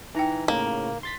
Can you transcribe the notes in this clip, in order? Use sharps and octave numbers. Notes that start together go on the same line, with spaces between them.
E3 D#4 G5 A#5
A2 C#3 A#3
C6 A6 B6